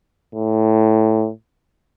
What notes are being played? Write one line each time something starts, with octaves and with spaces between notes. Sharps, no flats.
A2